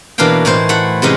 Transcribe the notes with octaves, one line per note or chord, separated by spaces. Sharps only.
B2 E3 A#3 D4 F5 G5
A2 E3 D#4 C5
A3 E4 F#5
C3 E3 G#3 C#4 D#4 D#5